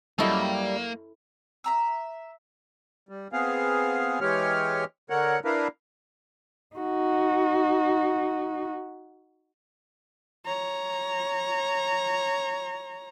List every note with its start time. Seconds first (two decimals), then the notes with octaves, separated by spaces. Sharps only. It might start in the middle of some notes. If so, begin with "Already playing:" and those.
0.18 F#2 G3 A#3 E4 A4 D#5
1.64 E5 A#5 E6
3.09 G3
3.33 B3 C4 G#4 F5
4.21 E3 G#3 G4 C#5 F6
5.10 D3 A#4 C#5 F#5
5.45 D4 E4 A#4 B4 F5
6.76 D#4 F#4
10.45 C#5 A#5